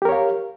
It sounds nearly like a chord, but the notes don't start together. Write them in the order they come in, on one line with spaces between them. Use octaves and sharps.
G4 A#4 C#5 F5